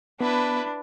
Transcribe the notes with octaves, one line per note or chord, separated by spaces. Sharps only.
B3 D4 E4 B4